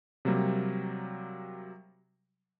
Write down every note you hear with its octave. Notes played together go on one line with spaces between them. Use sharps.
C3 F#3 G3 A#3